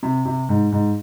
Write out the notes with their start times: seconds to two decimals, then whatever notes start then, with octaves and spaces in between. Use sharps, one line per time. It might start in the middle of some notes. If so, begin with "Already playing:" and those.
0.03 C3
0.26 C3
0.49 G#2
0.72 G#2